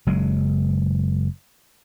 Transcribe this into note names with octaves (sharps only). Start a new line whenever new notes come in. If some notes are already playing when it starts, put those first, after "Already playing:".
F#1 F#3 G#3